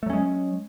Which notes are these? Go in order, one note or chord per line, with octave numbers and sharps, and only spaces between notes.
F#3 G#3 A3 C#4